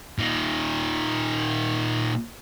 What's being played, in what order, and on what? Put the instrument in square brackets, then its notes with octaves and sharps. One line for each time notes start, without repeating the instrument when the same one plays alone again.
[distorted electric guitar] A#2 D#3